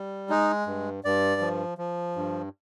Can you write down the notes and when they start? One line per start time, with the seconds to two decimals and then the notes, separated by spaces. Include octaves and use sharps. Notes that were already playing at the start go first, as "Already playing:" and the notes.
Already playing: G3
0.30 G#3 D#4
0.67 G2
1.04 G2 D5
1.41 F3
1.78 F3
2.16 G2